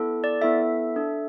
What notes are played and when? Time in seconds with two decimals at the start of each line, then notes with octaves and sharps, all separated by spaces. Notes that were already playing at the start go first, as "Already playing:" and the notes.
Already playing: B3 E4 A4
0.24 D5
0.41 B3 E4 A4 E5
0.96 D4 A4